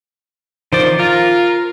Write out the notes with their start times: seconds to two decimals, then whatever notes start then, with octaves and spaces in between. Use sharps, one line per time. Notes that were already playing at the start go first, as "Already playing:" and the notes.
0.73 D#3 F3 C5 D5
0.99 F4 A#4